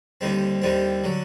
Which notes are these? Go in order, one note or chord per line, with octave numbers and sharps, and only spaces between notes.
D#2 D3 G3 C4
D#2 D3 G3 C4
D3 F#3